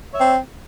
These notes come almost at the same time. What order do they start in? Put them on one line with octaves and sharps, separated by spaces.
C#5 E5 C4